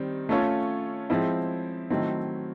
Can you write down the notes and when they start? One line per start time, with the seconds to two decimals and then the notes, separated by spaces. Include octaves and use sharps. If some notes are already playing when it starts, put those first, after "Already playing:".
Already playing: D#3 G3 C4
0.29 A3 C#4 F4 A4 C#5
1.10 F3 G#3 C4 E4
1.90 D#3 F#3 A3 C4 E4